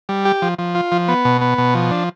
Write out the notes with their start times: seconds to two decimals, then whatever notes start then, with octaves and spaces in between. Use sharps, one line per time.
0.09 G3
0.25 G4
0.42 F3
0.59 F3
0.75 F4
0.92 F3
1.08 B3
1.25 B2
1.41 B3
1.58 B2
1.75 F3
1.91 D4